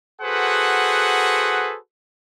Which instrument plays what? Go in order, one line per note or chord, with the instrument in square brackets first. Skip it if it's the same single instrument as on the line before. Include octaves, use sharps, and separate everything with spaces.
[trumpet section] F#4 G#4 A4 B4 C5 F#5